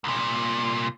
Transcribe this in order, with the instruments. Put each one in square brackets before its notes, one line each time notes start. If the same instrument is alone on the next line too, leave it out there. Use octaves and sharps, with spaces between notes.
[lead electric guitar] C2 A#2